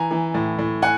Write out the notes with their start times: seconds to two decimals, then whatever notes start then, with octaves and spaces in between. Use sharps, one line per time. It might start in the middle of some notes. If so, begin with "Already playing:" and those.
Already playing: E3 G#5 A#5
0.11 E3
0.34 A2
0.59 A2
0.82 F#5 G#5